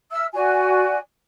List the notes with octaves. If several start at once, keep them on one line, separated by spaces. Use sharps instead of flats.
E5 E6 F6
F#4 D5 G#5